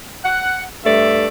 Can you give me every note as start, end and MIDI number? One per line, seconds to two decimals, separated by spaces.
0.24 0.63 78
0.85 1.27 43
0.85 1.27 57
0.85 1.27 74
0.85 1.27 76